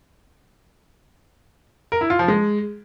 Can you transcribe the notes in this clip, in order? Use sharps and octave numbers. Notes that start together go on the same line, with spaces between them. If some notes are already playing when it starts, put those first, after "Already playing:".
A#4
E4
F4
F3
G#3